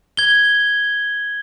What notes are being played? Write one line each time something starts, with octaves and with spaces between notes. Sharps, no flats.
G#6 G7